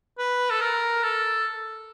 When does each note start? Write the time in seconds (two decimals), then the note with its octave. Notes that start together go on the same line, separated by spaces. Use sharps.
0.18 B4
0.50 A4
0.61 A#4
1.03 A4